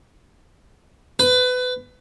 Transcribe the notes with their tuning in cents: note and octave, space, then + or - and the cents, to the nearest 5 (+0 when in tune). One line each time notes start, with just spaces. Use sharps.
B4 +25